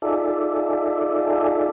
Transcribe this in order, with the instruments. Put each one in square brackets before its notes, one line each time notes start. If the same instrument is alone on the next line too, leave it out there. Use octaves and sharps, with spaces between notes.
[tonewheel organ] D#4 F4 G#4 A4 D5 E5